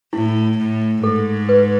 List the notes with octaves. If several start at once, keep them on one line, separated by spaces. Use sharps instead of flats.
A2 E4
A2
G#2 A4
B4